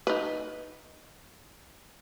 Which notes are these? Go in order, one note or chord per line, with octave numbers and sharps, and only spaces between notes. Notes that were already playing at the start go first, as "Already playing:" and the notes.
D#4 B4